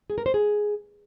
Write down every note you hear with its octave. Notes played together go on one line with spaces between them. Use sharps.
G#4
A#4
C5
G#4